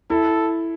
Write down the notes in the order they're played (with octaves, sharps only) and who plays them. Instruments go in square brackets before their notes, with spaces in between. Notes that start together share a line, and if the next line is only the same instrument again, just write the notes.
[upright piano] E4 [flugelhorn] A4